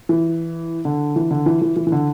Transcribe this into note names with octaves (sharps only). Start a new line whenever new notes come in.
E3
D3
E3
D3
E3
E3
E3
E3
D3